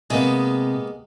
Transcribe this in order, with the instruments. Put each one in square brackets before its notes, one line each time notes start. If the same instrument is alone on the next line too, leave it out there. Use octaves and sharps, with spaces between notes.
[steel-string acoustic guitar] C3 [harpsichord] G#3 A#3 B3